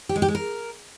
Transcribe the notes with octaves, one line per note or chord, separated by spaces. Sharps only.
G4
G#3
G4
G#3
A#4